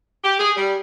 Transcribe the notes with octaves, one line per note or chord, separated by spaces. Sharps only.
G4
G#4
G3